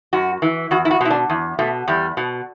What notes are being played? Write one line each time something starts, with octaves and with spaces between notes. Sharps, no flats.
F#2 F#4
E3
E2 F#4
E4
F#4
B2 E4
D4
E2
B2 A3
E2 G3
B2